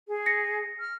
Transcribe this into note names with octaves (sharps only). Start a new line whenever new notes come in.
G#4
A#6 C#7
F6